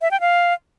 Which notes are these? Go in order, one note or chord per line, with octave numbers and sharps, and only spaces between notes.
E5
G5
F5